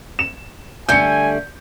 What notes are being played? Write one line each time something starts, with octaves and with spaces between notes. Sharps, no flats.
E7
D3 G3 A3 G#5 G6 C#7